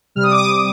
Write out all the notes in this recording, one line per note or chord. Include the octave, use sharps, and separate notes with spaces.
C3 G3 F6
D#6
D6
D#6